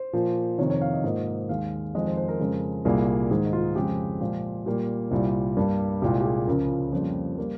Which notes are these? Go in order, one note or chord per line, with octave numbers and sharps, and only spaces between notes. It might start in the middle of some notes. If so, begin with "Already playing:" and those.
Already playing: C5
A#2 F3 A#3
F2 C3 D#3 C#5
C#5
F5
D#5
G#2 F3 A#3 D#5
D#2 D#3 G#3 F5
F2 D#3 G#3 D#5
C5
C5
A#4
F2 C#3 G#3
C2 A#2 G3 A#3 G#4
G#2 D#3 G#3 G#4
D#4
F4
F2 C#3 G#3 G4
A#2 F3 G#3
A#2 G3 A#3 G4
C2 A#2 G3
G2 G3 A#3
C2 A#2 G#3 G4
G4
G#4
C#2 C#3 F3 A#4
F2 C#3 G3 A#3 C5
G3 A#3